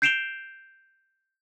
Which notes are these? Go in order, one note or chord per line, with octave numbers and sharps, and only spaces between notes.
G6 C7 D7 E7 F7 G7